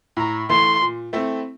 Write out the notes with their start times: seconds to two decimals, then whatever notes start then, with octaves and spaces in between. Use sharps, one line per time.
0.17 A2 A#5
0.50 E3 A3 C6
0.81 A#2
1.13 A3 C4 E4